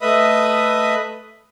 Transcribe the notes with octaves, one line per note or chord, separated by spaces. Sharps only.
A3 B4 D#5 E5 B5 D#6